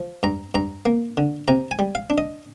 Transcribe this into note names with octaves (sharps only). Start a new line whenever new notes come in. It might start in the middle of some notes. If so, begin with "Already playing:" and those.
Already playing: F3
G2 A#5
G2 A#5
A#3
D3
C3 A#5
G#5
G3
F5
D4
D#5